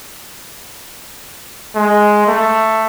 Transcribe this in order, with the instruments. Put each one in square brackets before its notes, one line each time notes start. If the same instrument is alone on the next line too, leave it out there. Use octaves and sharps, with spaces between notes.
[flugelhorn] G#3
A3